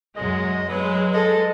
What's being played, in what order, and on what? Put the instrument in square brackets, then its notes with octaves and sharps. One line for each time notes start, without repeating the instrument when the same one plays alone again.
[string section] F#2 F#3 G#3 [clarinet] D#5
[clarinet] F#3 [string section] G#3 [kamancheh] B4
[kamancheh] A4 [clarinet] D#5